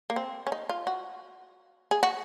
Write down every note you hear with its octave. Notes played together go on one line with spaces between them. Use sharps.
A#3
C4
C#4
D#4
F4
F#4
G#4
F#4